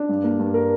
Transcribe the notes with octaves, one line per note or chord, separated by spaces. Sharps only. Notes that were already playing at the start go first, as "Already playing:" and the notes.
Already playing: D4
G2
A#3
G2
A#4